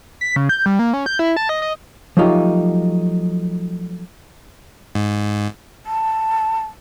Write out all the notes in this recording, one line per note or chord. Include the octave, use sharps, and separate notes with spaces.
B6
C#3
G6
G3
A#3
C#4
G6
E4
A5
D#5
D#5
F3 F#3 A3 D#4 F4 G4
G#2
A5